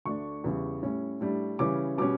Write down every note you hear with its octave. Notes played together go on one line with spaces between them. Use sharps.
D2 D3 A3 D4 C#6
E2 C#3 G3
A2 G3 C#4
A2 G3 D4
C#3 E3 G3 C#4 D6
B2 G3 C#4 D6